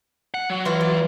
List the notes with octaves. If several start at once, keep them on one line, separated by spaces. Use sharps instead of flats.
F#5
F#3
E3 F4
D5